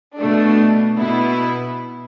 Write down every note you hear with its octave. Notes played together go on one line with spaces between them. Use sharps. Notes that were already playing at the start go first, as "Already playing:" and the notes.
B2 A3 D4
B2 B3 E4